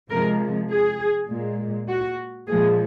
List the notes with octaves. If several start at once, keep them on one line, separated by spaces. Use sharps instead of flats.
C3 F3 G#3 A#4
G#4
A#2 G#3
F#4
A#2 F3 G#3 G#4